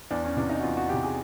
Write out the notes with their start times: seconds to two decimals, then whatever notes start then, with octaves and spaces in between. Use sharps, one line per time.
0.11 E2 D4
0.24 C#4
0.37 C3 E3 D4
0.50 D#4
0.59 F#4
0.63 E2 F4
0.77 F#4
0.89 C3 E3 G4
1.03 G#4